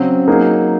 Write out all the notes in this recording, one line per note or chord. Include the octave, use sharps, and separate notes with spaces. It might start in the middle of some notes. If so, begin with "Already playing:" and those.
Already playing: C#3 F#3 C4
F#3 A#3 D#4 G#4